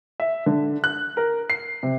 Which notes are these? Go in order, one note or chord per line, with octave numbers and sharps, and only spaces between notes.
E5
D3
F#6
A#4
C7
C3